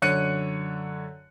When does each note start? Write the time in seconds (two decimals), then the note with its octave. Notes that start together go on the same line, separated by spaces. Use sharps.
0.02 F#2 D3 C#5 F#6 C#7 D#7